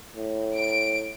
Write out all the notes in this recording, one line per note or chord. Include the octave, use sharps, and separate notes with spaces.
A2
D7